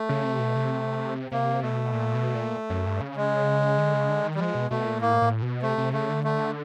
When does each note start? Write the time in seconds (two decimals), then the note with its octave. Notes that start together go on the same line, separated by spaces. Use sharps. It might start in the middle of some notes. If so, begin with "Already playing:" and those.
Already playing: A3
0.09 C#3
0.25 C3
0.39 B2
0.55 C3
1.32 C3 A#3
1.63 B2 A3
1.93 A#2
2.14 B2
2.35 A#2
2.70 F#2
2.86 G2
3.01 C#3
3.16 G#3
3.78 D3
3.94 C#3
4.09 D3
4.24 D#3
4.35 G3
4.39 F3 G#3
4.55 B2
4.70 B2 A3
4.85 A#2
5.01 A2 A#3
5.22 A2
5.42 B2
5.62 C3 A3
5.78 C3
5.93 C#3 A3
6.09 D3
6.24 A3